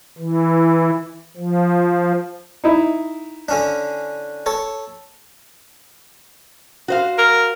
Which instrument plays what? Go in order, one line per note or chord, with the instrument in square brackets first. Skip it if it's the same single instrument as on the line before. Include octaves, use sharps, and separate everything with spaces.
[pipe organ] E3
F3
[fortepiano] D#4 E4
[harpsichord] D3 C#4 D4
A4 C#5 A5
[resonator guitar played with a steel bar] F#4 C5 F5
[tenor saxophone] A#4